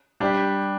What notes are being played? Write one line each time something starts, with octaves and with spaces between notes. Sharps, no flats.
G3 D4 G4